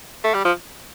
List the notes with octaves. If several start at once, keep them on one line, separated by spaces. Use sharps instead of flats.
A3
G3
F3